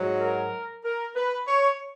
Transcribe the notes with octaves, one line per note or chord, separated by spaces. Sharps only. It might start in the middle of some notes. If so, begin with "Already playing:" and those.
Already playing: G#2 F#3
A#4
A#4
B4
C#5